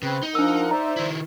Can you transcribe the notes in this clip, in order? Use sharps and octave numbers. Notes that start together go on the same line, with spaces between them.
C#3 C4 B4
D#4 G7
F3 D4 A#4 F#5 E6
C5 D5 E5 A#5
D#3 E4